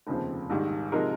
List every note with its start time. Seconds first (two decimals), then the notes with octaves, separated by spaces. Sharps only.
0.07 F1 D#2 C#3 F3 C4
0.50 A#1 G#2 D#3 G3
0.92 C3 F3 G#3 D#4 A#4